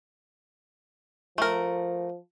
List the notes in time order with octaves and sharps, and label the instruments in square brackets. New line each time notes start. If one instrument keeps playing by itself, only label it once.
[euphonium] F3 [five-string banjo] A3 A#4